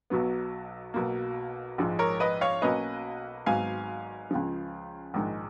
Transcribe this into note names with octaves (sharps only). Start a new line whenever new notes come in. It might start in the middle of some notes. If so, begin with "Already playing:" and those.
B1 B2 F#3 B3
B1 B2 A#3
A#1 G#2 F3 G#3
A#4 C#5
B4 D#5
C#5 F5
B1 B2 A#3 C#4 B4 D#5
G#1 G#2 F#3 B3 F5 G#5
C#2 C#3 F3
A#1 G#2 D#3 G#3